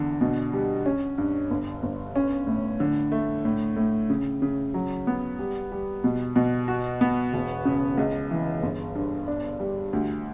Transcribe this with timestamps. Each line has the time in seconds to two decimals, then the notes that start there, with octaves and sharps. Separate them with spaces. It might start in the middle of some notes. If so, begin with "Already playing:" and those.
Already playing: E2 D3
0.21 B2
0.53 G3
0.86 C#4
1.18 G2
1.50 G1
1.83 G1
2.16 C#4
2.47 A2
2.80 D3
3.12 A3
3.45 A2
3.76 A2
4.10 C#3
4.42 C#3
4.74 F#3
5.07 B3
5.39 G3
5.72 G3
6.04 B2
6.36 B2
6.68 F#4
7.01 B3
7.33 E1
7.65 C#3
7.97 C#2
8.31 E3
8.62 G1
8.95 G2
9.28 D4
9.60 G3
9.93 D2